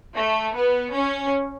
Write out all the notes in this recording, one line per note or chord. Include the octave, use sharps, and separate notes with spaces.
A3
B3
C#4